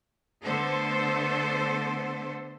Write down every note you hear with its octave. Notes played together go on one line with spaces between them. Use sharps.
D3 A3 B3 A4 C5